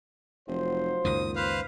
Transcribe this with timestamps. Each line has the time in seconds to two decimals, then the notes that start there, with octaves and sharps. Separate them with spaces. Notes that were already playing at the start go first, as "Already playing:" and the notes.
0.48 F1 F#3 F4 C5
1.05 C#2 F#2 A#2 D#3 D#6
1.36 B4 C5 F5